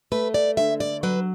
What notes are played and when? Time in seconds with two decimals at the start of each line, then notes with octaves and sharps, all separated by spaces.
0.12 A3 B4
0.34 D5
0.57 D3 E5
0.80 D5
1.03 F#3 B4